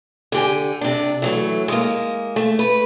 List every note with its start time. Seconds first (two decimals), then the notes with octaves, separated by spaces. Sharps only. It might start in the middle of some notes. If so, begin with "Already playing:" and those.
0.32 D3 G4 G#5
0.81 C3 D4
1.22 E3 F#3 A3
1.68 G#3 A#3
2.36 A3
2.59 B4